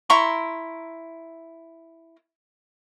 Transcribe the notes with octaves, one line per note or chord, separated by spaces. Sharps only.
E4 A#5 C6 C#6